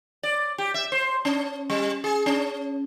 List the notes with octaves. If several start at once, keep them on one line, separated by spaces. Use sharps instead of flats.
D5
G4
E5
C5
C#4
G3
G#4
C#4